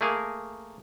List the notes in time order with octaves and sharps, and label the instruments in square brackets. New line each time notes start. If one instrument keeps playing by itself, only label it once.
[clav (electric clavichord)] A3 A#3 G#4 A#4